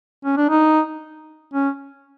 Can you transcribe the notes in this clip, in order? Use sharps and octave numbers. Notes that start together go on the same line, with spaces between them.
C#4
D4
D#4
C#4